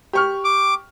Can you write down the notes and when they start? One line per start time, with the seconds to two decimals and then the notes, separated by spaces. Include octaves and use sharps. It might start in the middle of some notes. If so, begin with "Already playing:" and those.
0.13 G4 C#6 F6
0.44 D6